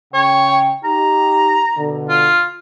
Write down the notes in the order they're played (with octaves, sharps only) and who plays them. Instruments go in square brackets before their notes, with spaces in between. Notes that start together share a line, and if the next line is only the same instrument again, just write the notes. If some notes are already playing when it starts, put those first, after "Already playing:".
[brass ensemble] C#3 G5 [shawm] C#5
[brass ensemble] D#4 G4 [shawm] A#5
[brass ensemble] B2 D3
[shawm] F4